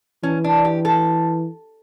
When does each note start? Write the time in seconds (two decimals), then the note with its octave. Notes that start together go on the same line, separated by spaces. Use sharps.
0.23 E3 C#4
0.44 D4
0.65 G4
0.85 A4